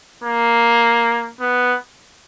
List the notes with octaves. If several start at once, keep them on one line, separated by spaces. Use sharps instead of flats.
A#3
B3